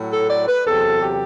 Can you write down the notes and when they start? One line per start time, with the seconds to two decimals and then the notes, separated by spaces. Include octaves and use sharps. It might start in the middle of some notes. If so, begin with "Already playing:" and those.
Already playing: A2 F#3
0.12 A4
0.29 D5
0.47 B4
0.66 E2 C3 F#3 A4
1.02 G4